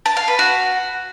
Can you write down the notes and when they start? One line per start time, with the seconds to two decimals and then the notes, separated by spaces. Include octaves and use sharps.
0.06 A5
0.17 F5
0.28 B4
0.39 F#4